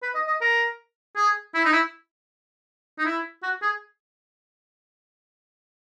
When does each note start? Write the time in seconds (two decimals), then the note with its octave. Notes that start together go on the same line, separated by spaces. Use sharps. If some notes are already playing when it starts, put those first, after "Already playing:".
0.03 B4
0.15 D#5
0.27 D#5
0.41 A#4
1.16 G#4
1.55 E4
1.65 D#4
1.73 E4
2.98 D#4
3.05 E4
3.43 F#4
3.62 G#4